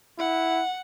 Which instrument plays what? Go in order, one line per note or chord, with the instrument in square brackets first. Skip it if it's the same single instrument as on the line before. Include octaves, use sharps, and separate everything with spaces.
[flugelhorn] E4 [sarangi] F#5